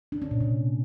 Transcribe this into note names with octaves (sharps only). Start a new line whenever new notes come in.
D4
C#4
A#2
C3